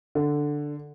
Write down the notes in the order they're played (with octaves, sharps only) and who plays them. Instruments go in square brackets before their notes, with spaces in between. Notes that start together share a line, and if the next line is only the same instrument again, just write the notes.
[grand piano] D3